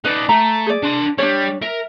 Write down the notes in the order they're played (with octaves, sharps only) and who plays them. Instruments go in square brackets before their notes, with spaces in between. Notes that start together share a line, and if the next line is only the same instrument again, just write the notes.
[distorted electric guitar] D#4 D5 [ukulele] B4
[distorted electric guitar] A3 [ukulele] A#5
[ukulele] G#4 D5
[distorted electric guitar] D4 C6
[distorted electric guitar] G3 [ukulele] D4 C#5
[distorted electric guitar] A#4 [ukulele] E5